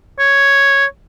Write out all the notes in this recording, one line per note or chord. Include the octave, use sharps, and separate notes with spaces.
C#5